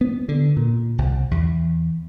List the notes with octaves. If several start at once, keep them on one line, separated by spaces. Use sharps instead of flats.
B3
D3
A#2
C2
E2